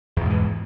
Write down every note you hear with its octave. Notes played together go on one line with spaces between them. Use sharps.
E2 G#2 B2 E3